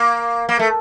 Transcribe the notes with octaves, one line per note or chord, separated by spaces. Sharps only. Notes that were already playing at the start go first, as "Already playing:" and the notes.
Already playing: A#3
A#3
A3